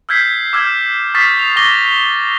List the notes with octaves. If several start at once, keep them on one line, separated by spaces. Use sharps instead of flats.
E6 F6 G6 G#6 B6 C7
D6 E6 F6 G6 G#6 E7
C#6 D#6 F6 A6 B6 C7
F7
C#6 D6 A#6 G7